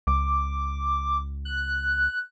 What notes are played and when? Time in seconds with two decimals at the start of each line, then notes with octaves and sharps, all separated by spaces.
0.07 C#2 D6
1.45 F#6